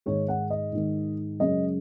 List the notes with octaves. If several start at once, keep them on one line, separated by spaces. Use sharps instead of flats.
G#2 D#3 G#3 C#5
F#5
D#5
G#2 D#3 G#3
F#2 C#3 G#3 D#5